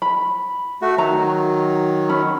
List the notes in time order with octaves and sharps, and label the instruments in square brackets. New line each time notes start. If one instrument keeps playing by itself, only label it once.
[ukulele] B5
[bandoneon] A3 F#4
[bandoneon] D#3 F#3 [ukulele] A#5
[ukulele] C#4 B5